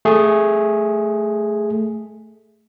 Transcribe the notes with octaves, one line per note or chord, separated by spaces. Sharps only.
A3 G#4